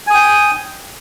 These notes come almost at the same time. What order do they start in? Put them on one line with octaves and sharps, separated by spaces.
G#5 D#6 G5